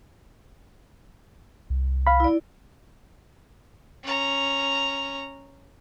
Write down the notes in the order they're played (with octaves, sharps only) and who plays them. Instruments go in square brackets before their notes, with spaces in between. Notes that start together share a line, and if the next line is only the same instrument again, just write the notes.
[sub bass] C2
[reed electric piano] F5 B5
[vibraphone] E4 D5
[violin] C#4 A#5